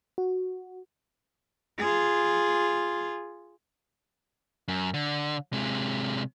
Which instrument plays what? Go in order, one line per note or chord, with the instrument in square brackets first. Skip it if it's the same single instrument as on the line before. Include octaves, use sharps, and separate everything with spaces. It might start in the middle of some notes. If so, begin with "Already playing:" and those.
[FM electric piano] F#4
[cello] F4 G#4
[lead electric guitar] F#2
D3
C3 G#3